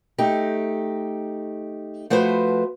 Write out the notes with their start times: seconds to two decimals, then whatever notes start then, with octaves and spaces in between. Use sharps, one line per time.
0.18 A3 D#4 G4
2.10 F3 A3 F#4 B4 C5